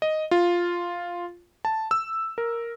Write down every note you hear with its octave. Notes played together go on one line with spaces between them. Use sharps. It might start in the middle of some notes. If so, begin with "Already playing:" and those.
D#5
F4
A5
E6
A#4